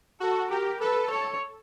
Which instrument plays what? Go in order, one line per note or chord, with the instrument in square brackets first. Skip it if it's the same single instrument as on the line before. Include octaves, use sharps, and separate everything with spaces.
[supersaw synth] F#4 [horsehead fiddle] A4
[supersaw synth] G4 [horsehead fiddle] A#4
[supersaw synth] A4 [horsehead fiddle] B4
[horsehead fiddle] C#5